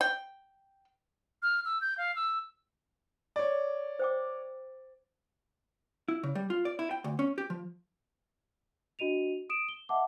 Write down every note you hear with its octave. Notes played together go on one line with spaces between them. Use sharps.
G5
F6
E6
G6
F5
E6
C#5 D5
C5 G5 D6
E4
C#3
G3
F4
D5
E4
G5
D2
C#4
G4
F3
D4 F#4 D#5 D#7 F7
D#6 D7 E7
G7
D#5 E5 F#5 A5 D6